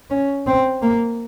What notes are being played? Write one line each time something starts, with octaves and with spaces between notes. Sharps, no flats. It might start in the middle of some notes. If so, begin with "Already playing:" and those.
C#4
C4
A#3